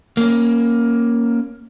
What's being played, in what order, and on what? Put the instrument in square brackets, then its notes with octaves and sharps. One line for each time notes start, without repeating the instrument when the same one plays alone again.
[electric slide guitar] A#3 C#4